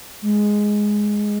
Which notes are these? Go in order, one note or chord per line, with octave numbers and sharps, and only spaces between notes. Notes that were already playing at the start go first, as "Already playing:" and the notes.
G#3